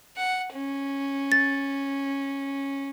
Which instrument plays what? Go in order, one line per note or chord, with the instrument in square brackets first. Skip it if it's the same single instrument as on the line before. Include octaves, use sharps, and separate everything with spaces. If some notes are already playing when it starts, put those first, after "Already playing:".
[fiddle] F#5
C#4
[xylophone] A6